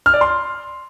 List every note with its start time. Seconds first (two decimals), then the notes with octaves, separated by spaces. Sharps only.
0.06 F6
0.14 D5
0.21 C6